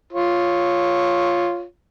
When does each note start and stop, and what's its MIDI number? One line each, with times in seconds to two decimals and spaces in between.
0.13 1.63 65
0.13 1.63 73